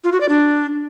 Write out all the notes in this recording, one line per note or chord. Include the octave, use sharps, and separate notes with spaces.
F4
F#4
D5
D4